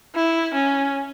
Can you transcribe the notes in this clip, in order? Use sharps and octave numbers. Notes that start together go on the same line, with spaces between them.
E4
C#4